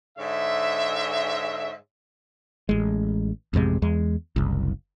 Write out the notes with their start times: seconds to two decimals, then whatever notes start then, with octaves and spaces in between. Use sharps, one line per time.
0.18 G#2 D3 C#5 E5
2.69 A1 G#3
3.53 A1 F2 C3 G#3
3.82 E2 G#3
4.36 F#1 C2